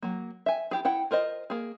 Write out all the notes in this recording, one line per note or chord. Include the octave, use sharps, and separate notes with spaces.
F#3 A#3
E5 G#5
E4 G4 G#4
E4 F#5 G5
F4 A#4 C5 D#5
A#3 G#4